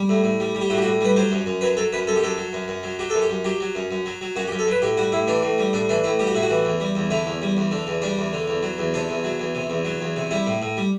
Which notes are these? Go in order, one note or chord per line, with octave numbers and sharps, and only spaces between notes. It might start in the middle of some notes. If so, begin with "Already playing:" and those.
Already playing: G3
A2
A2
G3
G3
G4
A2 F#4
G4
F#4
A2
G3 B4
F#3 C5
F#2
F#2
F#3 B4
F#3 A4
F#2 B4
F#2 A4
G4
F#3 A4
F#3
F#2
F#2
F#3
F#3 G4
F#2 A4
G4
F#2
F#3 G4
F#3
F#2
F#2
F#3
F#3
F#2 F#4
G4
F#2
A4
F#3 B4
A2 G4
G3 F#4
A2 E4
E3 D4
A2
G3
A2 D4
E3 D4
A2 E4
G3 G4
F#4
A2 E4
F#4
E3
E2
G3
E2
D3 E4
E2
G3
E2
D3
E2
G3 D4
E2
D3
E2
F#3
E2
C3 D4
E2
F#3
E2
C3
E2
F#3
E2
C3
G3 E4
A2
A2
G3